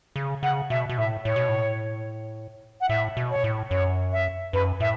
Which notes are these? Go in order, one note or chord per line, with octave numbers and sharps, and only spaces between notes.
C#3
C#3 F#5
B2 E5
B2
A2 E5
A2 C#5
B2
A2
F#5
A2 E5
B2
C#5
A2
F#2 C#5
E5
F#2 B4
A2 E5